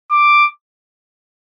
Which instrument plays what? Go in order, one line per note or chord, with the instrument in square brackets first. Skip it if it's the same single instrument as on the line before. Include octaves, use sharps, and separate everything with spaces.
[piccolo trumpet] D6